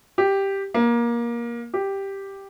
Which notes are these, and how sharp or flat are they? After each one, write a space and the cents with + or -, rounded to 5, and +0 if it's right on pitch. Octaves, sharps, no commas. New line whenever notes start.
G4 +0
A#3 +20
G4 +0